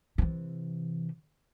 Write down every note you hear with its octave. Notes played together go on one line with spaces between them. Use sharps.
C3 E3